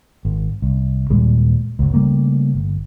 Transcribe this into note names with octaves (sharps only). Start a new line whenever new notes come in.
G#1
C2
D#2 A#2 G3 G#3
G1 C#2
C#3 G3 A3 A#3
G1